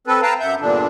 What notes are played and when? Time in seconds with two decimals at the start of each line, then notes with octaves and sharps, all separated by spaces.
0.07 C4 A4 B4
0.22 B4 F5 G5 A5 A#5
0.40 F#2 E5 F#5 G6
0.60 E2 G2 A#2 D3 D4